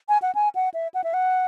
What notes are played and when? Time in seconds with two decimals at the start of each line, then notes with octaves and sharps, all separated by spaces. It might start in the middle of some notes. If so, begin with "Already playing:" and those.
0.09 G#5
0.22 F#5
0.35 G#5
0.55 F#5
0.74 E5
0.94 F#5
1.04 E5
1.14 F#5